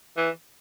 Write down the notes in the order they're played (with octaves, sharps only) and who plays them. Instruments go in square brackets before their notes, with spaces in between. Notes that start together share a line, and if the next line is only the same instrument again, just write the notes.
[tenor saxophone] E3